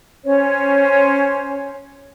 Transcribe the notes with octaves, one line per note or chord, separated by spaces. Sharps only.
C#4 C5 C#5